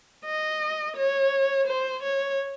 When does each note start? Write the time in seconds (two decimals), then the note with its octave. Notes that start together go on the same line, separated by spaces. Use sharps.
0.25 D#5
0.96 C#5
1.67 C5
2.02 C#5